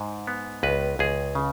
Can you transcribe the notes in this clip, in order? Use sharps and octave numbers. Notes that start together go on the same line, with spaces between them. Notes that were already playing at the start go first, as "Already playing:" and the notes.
Already playing: G#2
B3
C#2 B4
C#2 G#4
C#3